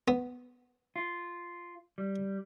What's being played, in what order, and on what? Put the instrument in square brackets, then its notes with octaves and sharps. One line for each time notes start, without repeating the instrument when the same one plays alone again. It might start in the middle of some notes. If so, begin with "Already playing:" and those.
[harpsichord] B3
[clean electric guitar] F4
G3